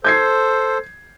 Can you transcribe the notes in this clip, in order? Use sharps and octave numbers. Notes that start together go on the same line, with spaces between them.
A4 C5 G6 G#6 C7